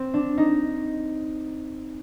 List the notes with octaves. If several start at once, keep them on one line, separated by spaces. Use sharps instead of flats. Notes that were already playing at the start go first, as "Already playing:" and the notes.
Already playing: C4
D4
D#4